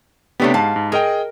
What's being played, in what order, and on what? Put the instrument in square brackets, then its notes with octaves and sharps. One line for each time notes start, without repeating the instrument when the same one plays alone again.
[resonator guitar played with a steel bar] C3 A3 G4 [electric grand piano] B3 D4 C#5
[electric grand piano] G#2 [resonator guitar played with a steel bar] F5 A5
[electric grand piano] G#2
[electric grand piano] G#4 D#5 G5 [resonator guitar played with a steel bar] A#4